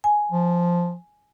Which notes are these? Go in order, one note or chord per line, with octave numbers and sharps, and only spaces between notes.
G#5
F3